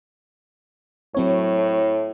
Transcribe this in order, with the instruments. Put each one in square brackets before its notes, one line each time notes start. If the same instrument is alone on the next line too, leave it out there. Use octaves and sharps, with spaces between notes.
[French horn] A2 [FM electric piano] F#3 C4 C#5